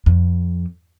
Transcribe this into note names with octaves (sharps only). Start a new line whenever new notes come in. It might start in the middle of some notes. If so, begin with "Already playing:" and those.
F2